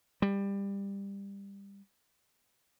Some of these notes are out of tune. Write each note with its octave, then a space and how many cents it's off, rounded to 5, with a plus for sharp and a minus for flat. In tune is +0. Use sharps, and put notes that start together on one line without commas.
G3 +20